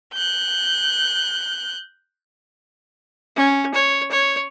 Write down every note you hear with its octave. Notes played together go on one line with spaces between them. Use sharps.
F#6 G6
C#4
C#5
C#5